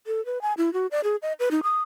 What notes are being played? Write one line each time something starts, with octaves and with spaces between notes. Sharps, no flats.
A4
B4
G#5
E4
F#4
D5
G#4
D#5
B4
D#4
D#6